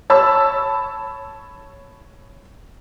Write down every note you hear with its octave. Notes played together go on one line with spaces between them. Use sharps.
C#5 A5 B5 E6